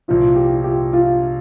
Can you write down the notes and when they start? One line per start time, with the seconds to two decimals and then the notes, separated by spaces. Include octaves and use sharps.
0.08 C2 A#2 F3 F4
0.36 G4
0.53 F4
0.64 G4
0.93 F4